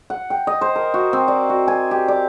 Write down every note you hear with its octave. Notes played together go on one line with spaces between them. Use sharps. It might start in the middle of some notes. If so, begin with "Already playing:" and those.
F#5
G5
D#5
C5
A#4
F#4
C4
D5
F#4
G#5
G4
D5